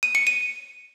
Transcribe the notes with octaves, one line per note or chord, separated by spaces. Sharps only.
D#7
C#7
D#7